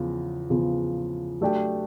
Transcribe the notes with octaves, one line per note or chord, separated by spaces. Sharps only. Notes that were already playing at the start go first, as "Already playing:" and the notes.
Already playing: E2 C#3 F3
E2 C#3 F3
F#3 A3 D4 G4